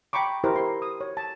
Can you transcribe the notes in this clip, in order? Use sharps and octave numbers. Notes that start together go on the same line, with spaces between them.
G5 A#5 B5 C#6 D6
E4 G4 A#4 C5
C6
D#6
C#5
A5